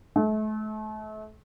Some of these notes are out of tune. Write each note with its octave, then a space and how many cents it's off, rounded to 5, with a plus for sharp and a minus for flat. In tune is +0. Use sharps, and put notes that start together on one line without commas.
A3 -35